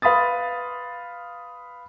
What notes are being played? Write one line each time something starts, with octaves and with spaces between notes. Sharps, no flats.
B4 F5 B5 C6 D#6 A6